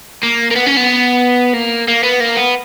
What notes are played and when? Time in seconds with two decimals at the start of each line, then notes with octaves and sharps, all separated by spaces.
0.23 A#3
0.51 A#3
0.56 B3
0.66 C#4
0.77 B3
1.54 A#3
1.88 A#3
2.03 B3
2.20 A#3
2.37 B3